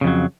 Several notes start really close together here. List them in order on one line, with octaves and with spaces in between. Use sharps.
C#3 F2 F#3